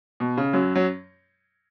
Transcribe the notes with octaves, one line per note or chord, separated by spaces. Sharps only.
B2
C#3
F#2 F#3
F#3